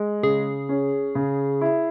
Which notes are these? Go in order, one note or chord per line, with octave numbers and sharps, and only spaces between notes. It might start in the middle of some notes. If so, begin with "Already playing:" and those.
Already playing: G#3
C#3 G#4
C#4
C#3
E4